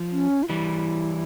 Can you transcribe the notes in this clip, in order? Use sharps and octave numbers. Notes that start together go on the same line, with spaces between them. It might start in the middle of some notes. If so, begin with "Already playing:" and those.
Already playing: F3
C#4
F4
E3 G3 E4